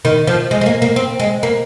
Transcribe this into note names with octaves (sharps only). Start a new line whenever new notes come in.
D#3
F3
G#3
G#3
A#3
A#3
C4
G#3
A#3